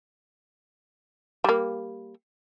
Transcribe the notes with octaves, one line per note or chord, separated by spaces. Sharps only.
G3 A#3